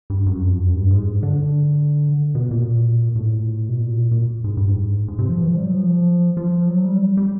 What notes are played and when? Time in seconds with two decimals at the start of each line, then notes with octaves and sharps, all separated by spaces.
0.10 G2
0.26 F#2
0.42 F2
0.58 F#2
0.74 G2
0.90 G#2
1.23 D3
2.35 B2
2.51 A#2
3.16 A2
3.69 B2
3.79 A#2
4.11 A#2
4.44 G#2
4.57 G2
4.69 G#2
5.08 G#2
5.19 C3
5.29 F3
5.40 E3
5.49 F3
5.56 G3
5.64 F#3
5.72 F3
6.37 F3
6.68 F#3
6.85 G3
7.17 G3